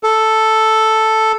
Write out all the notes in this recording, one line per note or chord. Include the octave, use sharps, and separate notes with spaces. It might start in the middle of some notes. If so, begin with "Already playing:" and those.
A4